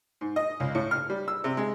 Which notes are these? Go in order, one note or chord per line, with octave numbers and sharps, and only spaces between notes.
G#2
D#5
C#2
A2
F6
G3
E6
C3
G#3